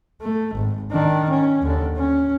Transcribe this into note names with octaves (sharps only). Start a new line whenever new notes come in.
A3
G#1
D#3 D4
C#4
D#2 D3
C#4